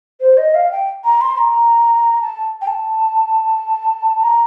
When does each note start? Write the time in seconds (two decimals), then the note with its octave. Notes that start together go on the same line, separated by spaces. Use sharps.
0.21 C5
0.37 D#5
0.54 F5
0.71 G5
1.04 A#5
1.21 C6
1.38 A#5
2.21 A5
2.61 G5
2.67 A5
4.23 A#5